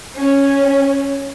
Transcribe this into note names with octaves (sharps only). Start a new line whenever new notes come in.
C#4